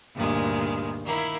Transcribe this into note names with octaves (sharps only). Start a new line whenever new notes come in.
D2 G2 A#2 D#3 G#3
D#3 A#3 E4